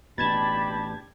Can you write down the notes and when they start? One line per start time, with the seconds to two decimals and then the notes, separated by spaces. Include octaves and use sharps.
0.18 A1 B2 D4 G4 A5 B5 G#6 A6